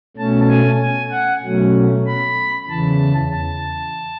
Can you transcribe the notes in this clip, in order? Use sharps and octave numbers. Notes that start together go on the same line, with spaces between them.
B2 A3 C#4 A5
G#5
G#5
F#5
B2 F#3 A3 C#4
B5
E2 C#3 E3 A5
A5